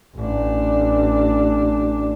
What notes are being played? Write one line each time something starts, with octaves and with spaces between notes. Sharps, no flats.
A1 D4